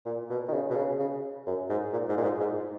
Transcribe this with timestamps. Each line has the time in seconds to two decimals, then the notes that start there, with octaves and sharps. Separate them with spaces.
0.06 A#2
0.30 B2
0.48 D#3
0.53 C#3
0.70 B2
0.76 C#3
0.99 C#3
1.46 F#2
1.69 G#2
1.93 A#2
2.09 G#2
2.17 A#2
2.23 G#2
2.40 G#2